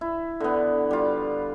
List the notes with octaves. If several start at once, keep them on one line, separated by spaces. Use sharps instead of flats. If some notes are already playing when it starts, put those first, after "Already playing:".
E4
D3 B3
G3 F4